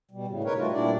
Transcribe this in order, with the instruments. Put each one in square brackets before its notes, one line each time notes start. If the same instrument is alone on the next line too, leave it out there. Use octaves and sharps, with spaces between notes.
[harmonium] B2 G3
A2 C#3
D#4 A#4 B4 C#5
G3 A3 F4 F#4
A#2 G3 D4 E4 D5